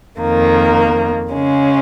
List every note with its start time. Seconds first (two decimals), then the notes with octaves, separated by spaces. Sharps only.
0.20 F2 D#3 A#3
1.31 C#3 G#3 C#4